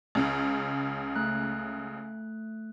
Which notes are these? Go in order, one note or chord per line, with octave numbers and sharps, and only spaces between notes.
C#2 C#3
A3 F#6